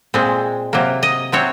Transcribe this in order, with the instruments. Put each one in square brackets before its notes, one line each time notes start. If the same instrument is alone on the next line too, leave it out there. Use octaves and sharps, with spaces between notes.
[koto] A#2 G#3 C4
C3 F#3 A#3
D#5
C3 F#3 C4 C#5